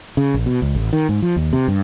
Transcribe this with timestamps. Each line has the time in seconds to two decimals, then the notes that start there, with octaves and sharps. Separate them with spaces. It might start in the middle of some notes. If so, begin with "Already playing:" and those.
0.17 C#3
0.34 A#1
0.46 B2
0.62 C#2
0.75 A1
0.93 D#3
1.09 G#2
1.22 F3
1.36 D#2
1.53 C3
1.68 G2